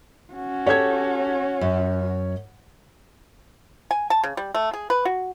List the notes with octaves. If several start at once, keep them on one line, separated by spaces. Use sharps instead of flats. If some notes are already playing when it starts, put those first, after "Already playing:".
C#4 F#4
G4 A4 C#5 G5 G#6
F#2
G#5
A5
C#3
G3
A3
G#4
B4
F#4